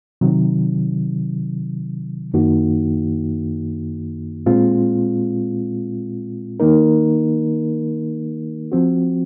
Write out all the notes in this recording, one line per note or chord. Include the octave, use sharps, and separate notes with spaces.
C3 D#3 F#3
F#2 D#3 A#3 D#4 F#4
A#2 G#3 C4 F4
D#3 A#3 D#4 A#4
F3 C4 F#4